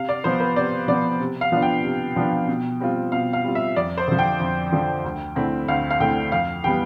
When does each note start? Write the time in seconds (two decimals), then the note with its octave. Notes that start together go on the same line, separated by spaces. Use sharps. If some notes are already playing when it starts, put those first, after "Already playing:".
Already playing: C3 F5
0.09 D5
0.24 F3 B3 C5
0.40 B4
0.56 C3 D5
0.88 F3 B3 D5
1.20 C3
1.41 F5
1.52 F3 B3 D4 F4
1.62 G5
1.84 C3
2.16 F3 B3 D4 F4
2.48 B2
2.80 G3 C4 F4
3.12 B2 F5
3.33 F5
3.44 G3 C4 F4
3.55 E5
3.76 F2 D5
3.98 C5
4.08 D3 F3
4.19 G5
4.40 F2
4.73 D3 F3
5.04 D2
5.36 D3 A3 C4 E4
5.68 D2 F5
5.91 F5
6.00 D3 A3 C4 E4 G5
6.32 F2 F5
6.64 E3 G3 B3 G5